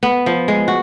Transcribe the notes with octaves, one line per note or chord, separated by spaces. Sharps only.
B3
F3
G#3
F#4